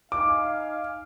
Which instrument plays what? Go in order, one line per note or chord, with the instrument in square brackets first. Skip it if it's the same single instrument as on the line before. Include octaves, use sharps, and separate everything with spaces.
[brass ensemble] D#4 F5 G#5 [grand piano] D6